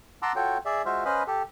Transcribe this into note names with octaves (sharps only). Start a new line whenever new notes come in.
F#5 A5 A#5 C6 D6 E6
F4 F#4 A4 C#5 G5
G#4 D5 E5
G#3 F4 F#4 C5 E5 F5
C#4 B4 C5 D#5 F5 B5
G4 A4